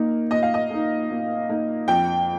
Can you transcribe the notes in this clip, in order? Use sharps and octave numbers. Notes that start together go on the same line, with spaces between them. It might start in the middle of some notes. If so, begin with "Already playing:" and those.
Already playing: A#2 A#3 D#4
A#2 D#5
F5
D#5
A#3 D#4
A#2
A#3 D#4
F2 G5